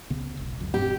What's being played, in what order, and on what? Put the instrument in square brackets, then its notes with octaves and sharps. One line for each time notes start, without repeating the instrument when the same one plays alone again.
[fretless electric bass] C#2 C#3 B3
E1 B1
C#2 F#2
[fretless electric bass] E1 G2 C4 [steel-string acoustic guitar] G4